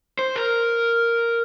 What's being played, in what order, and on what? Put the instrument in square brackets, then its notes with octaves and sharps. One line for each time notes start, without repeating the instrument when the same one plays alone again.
[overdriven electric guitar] C5
A#4